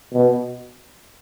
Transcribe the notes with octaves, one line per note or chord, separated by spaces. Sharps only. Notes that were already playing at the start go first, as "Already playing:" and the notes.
B2